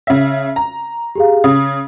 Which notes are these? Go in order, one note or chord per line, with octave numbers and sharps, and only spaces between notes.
C#3 E5
A#5
G4 G#4 F5
C#3 D#6